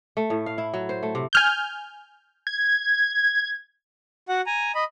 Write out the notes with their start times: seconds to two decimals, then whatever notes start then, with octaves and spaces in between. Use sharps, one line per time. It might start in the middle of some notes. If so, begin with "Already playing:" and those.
0.17 A3
0.30 A2
0.46 F5
0.58 E4
0.74 F#3
0.89 C5
1.03 A3
1.15 C3
1.33 G#5 F6 G6
2.47 G#6
4.29 F#4 F#5
4.46 G#5 A#5
4.75 D#5 B5